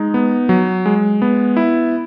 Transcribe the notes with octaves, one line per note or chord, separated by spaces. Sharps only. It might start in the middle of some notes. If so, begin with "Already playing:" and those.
Already playing: G#3 D#4
B3
F#3
G#3
B3
E4